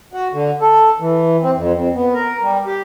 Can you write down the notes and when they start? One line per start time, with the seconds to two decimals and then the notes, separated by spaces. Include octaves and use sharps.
0.13 F#4
0.33 D3
0.61 A4
1.00 E3
1.43 C4
1.56 F2
1.74 F2
1.95 B3
2.14 A#4
2.43 G3
2.66 G4